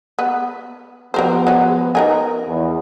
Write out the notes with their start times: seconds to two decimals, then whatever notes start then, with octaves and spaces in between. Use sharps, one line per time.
0.19 B3
1.14 F3 B3 G4 A#4 C5
1.47 F#3 G#3
1.95 D#4 A#4 G#5
2.45 E2